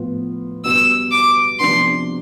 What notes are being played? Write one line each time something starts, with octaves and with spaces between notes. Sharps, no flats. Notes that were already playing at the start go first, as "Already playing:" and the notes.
Already playing: A2 F3 B3 F4
B2 G3 B3 E6
D6
C3 F3 B3 D4 C6